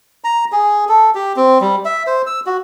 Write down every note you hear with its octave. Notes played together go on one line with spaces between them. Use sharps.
A#5
G#4
A4
G4
C4
G3
E5
C5
E6
F#4